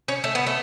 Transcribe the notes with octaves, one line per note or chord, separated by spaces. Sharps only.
C#4
A3
B3
A3